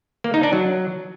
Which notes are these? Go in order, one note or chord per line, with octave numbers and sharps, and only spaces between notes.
A#3
D#4
D4
F#3